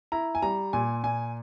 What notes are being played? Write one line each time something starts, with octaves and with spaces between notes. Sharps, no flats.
E4 A#5
G#5
G3 A#5
A#2 G#5
A#2 G#5